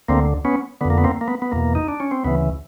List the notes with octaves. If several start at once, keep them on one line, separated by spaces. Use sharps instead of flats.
D2 D3 A#3 C4
B3 C#4
F2 D3 B3
A#3
B3
A#3 C4
A#3
B3
B3
E2 B2 A#3
D#4
D4
C#4
C4
D2 C#3 E3 B3